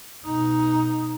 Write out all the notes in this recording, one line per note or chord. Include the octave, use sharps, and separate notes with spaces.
B2 D#4